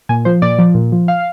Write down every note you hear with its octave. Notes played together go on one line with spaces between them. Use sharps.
A#2 G#5
F3 C5
A#2 D5
F3
A#2
F3
F5